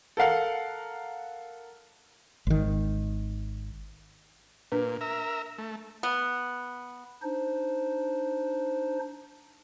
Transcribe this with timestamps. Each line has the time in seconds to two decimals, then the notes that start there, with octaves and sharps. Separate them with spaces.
0.17 A4 A#4 F5 F#5
2.47 G#1 D#3
4.72 A#2 D4 B4
5.01 A#4 E5
5.58 A3
6.03 B3
7.22 D4 D#4 C5